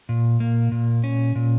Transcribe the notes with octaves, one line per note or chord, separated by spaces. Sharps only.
A#2
A#3
A#2
C#4
A#2